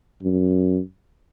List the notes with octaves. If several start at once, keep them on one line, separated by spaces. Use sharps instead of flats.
F#2